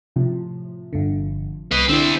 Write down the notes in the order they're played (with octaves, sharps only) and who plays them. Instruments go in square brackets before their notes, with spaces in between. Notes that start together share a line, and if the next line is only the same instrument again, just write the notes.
[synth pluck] A2 C3 F3
[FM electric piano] G1 D3
[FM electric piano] C2 [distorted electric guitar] B4 D#5
[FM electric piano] D3 E4 [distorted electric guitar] G3 C4